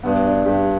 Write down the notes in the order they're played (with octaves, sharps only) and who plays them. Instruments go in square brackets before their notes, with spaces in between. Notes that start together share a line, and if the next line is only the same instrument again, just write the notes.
[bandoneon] G2 [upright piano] B3
[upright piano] D4
[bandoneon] G2 [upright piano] G4